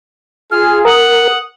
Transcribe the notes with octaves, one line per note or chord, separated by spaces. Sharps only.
F4 G#4 F6
A#4 F#5 D#6